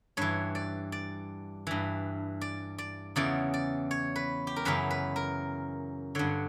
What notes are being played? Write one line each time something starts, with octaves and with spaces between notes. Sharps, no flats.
G2 E3 C#5
D5
D5
G2 E3
D5
D5
E2 C#3 E3 D5
D5
C#5
B4
G4
A#4
F#2 C#3 E3 B4
B4
A#4
G2 D3 C#5